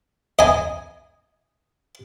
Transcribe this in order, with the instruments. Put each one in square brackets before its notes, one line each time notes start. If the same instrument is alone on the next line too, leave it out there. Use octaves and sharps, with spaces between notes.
[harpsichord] D#5 G#5